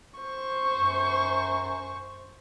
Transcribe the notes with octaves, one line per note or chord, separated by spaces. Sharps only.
C5 C#6
F#2